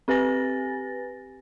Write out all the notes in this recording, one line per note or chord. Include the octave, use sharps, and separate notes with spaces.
C4 G4 B4 G#5 A6 A#6